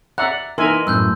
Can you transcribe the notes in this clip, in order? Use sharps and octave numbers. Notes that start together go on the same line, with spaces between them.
D5 E5 F#5 A#5 F#6
E3 D#4 A#4 E5 G#5 C6
F#2 A2 E6 F#6 G6